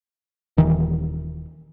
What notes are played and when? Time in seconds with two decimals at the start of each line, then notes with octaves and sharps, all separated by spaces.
0.57 D#1 D#3 E3